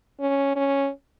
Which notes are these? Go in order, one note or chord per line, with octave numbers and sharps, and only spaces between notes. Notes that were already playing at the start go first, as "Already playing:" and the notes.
C#4
C#4